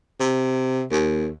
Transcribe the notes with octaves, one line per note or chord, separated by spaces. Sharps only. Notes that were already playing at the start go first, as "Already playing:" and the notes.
C3
D#2